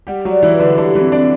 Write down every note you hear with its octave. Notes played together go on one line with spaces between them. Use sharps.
G3 G4 F#5
F#3 F#4
D5
E3 E4
B4
D3 D4
D3 D4 G4
E3 E4
C4
D4 D5